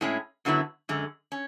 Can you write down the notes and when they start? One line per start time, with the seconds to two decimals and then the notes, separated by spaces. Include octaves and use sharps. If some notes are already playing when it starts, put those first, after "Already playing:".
0.01 A2 G#3 C#4 E4
0.45 F#2 D3 F#3 B3 E4
0.89 F#2 D3 G#3
1.32 C#4